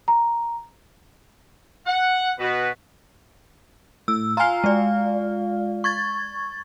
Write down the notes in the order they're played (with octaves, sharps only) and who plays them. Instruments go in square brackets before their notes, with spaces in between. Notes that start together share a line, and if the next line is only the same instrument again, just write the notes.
[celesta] A#5
[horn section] F#5
B2 F#4 B4
[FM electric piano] A2 [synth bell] E6
[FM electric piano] F4 F5 [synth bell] G#5 A#5
[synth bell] G#3 D5
C#6 G#6 A6